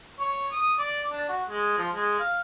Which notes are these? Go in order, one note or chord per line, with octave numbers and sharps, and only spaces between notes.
C#5
D#6
D5
D4
F#4
G#3
F3
G#3
F5